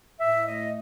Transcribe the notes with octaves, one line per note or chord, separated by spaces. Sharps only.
A2 E5
A3 D#5